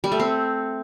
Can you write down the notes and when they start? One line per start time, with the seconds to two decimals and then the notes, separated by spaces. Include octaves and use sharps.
0.04 G3
0.12 A3
0.19 C4